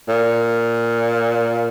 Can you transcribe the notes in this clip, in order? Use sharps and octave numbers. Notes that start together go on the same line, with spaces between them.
A#2